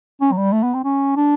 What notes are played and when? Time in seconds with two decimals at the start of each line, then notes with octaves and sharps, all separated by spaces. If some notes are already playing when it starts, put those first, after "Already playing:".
0.21 C#4
0.32 F#3
0.37 G3
0.53 A3
0.63 B3
0.74 C4
0.84 C#4
1.16 D4